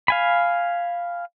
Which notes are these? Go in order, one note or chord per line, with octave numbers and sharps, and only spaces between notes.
F5 G#5 B5